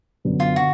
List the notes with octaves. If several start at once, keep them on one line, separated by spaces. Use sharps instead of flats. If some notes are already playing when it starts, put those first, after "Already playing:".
F#2 D3 F#3 B3 D4
F4
D3 F#4